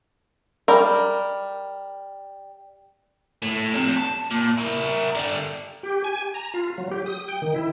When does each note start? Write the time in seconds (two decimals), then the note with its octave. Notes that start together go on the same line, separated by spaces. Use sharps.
0.68 G3 A#4
3.42 A2
3.74 F2 C3
3.97 A5
4.31 A#2
4.58 E4 A#4
5.15 D3 G3
5.83 G4
6.04 G#5
6.34 A#5
6.54 F4
6.78 F#3
6.91 G4
7.06 D#6
7.28 G5
7.42 D#3
7.55 E4